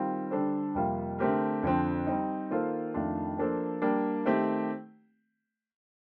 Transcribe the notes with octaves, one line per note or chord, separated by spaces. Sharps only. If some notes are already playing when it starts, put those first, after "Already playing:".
Already playing: D#3 G3 C4 F4
D3 G3 D4 A4 C5
F2 C3 G3 A#3 F4
D3 A3 C4 G4 A#4
F2 D3 F3 C4
G3 C4 D#4
D#3 A#3 F4 A4 C5
F2 D#3 A3 D4 F4
F3 A#3 D4 A4 C5
G3 A#3 D4
D#3 A3 C4 G4